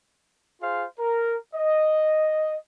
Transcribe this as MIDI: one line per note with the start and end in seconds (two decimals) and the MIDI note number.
0.61 0.85 65
0.61 0.85 68
0.61 0.85 72
0.61 0.85 77
0.99 1.36 70
1.55 2.56 75